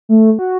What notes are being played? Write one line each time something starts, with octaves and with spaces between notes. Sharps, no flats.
A3
F#4